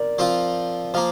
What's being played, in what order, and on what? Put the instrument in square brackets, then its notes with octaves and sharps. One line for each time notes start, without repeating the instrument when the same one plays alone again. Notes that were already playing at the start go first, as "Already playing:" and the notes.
Already playing: [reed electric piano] A#4 D5
[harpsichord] F3 C4 F4
[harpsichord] F3 A#3 [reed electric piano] C5 F5